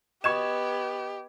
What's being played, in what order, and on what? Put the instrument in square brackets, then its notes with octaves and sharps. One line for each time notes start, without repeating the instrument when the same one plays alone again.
[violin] B3 [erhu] G4 [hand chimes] D#5 [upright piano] C#6 G#6 E7